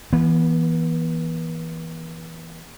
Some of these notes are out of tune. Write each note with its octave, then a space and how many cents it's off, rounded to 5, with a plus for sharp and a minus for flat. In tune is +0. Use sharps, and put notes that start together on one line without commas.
E3 +0 B3 -35